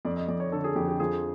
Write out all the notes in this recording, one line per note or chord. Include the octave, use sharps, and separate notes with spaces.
F2 D5
D#5
F2 D5
C#5
D3 A4
G#4
F2 G4
G4
F3 G#4